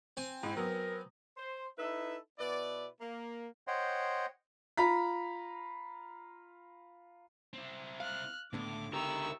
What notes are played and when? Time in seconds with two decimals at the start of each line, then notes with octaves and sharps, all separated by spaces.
0.17 C4 G#5
0.43 G#2 E4
0.57 F#3 B3 A#4
1.37 C5
1.77 D#4 E4 A4 B4 E5
2.38 B2 B3 E4 B4 D5
3.00 A#3
3.67 C5 C#5 D#5 F#5 G5 C6
4.78 F4 A#5 B5 B6
7.53 C4 E4
8.00 F5 F6 F#6
8.53 C#2 A2 D3 B3 D6
8.93 D#4 E4 G4 A#4 C#6 E6